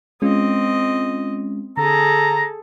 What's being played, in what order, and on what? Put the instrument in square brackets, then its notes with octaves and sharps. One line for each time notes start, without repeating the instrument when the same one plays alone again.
[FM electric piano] G#3 C#4 F4 [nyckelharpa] C4 D#5
[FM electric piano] D3 [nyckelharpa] G#4 A4 [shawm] A#5